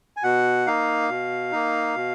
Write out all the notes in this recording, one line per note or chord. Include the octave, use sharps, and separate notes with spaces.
G#5
B2 F#5
A#3 D#4 F5
B2
A#3 D#4
B2